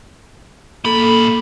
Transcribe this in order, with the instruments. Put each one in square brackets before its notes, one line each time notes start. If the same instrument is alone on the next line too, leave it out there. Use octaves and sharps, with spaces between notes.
[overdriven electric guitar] A#2 B5 [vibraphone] A#3 A4